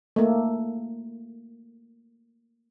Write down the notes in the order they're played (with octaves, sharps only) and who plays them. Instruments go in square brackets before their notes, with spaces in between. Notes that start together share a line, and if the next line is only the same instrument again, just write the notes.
[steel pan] A3 A#3